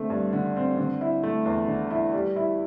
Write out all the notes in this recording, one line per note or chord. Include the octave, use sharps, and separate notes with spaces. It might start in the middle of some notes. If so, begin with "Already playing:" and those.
Already playing: D3 A3 C4
G2
D3
C4
D3
E4
A3
E2
D3
E4
G3
E4